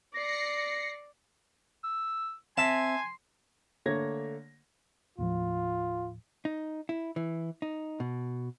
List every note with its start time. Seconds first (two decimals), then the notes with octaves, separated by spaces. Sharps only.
0.14 D5 A#6 C7 C#7
1.84 E6
2.57 C4 E5 G#5 A5 C6
3.86 D3 A3 A#3 C#5 G#6 A#6
5.18 D#2 A2 F3 F4
6.45 D#4
6.89 E4
7.16 E3
7.62 D#4
8.00 B2